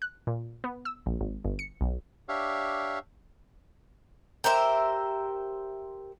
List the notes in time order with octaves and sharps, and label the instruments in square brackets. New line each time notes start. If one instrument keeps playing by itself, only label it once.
[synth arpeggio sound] F#6
A#2
B3
E6
A#1
G#1
G1
C#7
B1
[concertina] D4 G4 C#5 E5 F5
[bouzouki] G4 A#4 C5 E5